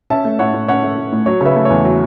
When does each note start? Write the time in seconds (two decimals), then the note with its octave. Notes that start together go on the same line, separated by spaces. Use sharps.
0.10 C#4 E5 A5
0.25 A3
0.39 A2 C#5 F#5
0.54 A2
0.68 C#4 C#5 F#5
0.83 A3
0.98 A2
1.12 A2
1.26 F#3 C#5
1.41 C#3 B4 E5
1.56 A3
1.65 C#5
1.70 E2
1.85 F#3